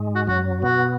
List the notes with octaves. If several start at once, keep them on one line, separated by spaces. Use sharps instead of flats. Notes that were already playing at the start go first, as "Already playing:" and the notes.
Already playing: G#2 G#3
F#4
F#2 F#3 F#4
B2 B3 F#4